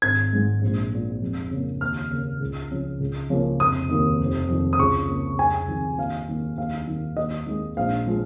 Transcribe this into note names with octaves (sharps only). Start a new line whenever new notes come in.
G#1 G#6
G#2 G#3
A#1
A#2 G#3
F2
C#3 A#3
D#2 F6
C#3 A#3
C#2
C#3 F3
C#2
C#3 F3 A#3
F1 D#6
D#2 D#3 A#3
F1
F2 D#3
D#6
C#2 C#6
C#3 A#3
F1 G#5
F2 D#3
D#2 F5
D#3 A#3
D#2 F5
D#3 A#3
D#2 D#5
D#3 G#3
A#1 F5
F3 G#3